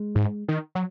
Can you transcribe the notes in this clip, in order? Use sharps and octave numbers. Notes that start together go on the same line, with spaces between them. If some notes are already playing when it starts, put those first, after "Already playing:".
Already playing: G#3
G#2
D#3
F#3